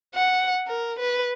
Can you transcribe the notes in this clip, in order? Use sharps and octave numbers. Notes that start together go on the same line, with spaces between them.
F#5
A#4
B4